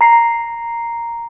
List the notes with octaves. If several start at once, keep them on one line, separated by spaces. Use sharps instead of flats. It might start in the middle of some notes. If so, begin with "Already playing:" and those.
A#5 C7